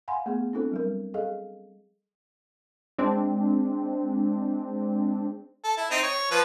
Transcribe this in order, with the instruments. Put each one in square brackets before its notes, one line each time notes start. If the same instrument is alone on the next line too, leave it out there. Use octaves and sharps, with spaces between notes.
[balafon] F5 F#5 G#5 B5 C6
A3 B3 G#4
C4 D4 E4 A4 C5
F#3 G3 A#4
G#4 A4 D#5 F5
[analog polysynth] G#3 C4 D4
[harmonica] A4
E4
C4 D#4
C#5
F3 B4